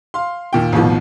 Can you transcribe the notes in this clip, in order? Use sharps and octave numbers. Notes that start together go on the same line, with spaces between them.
F5 C6
D#2 A#2 G5
A1 D#2 B2 F3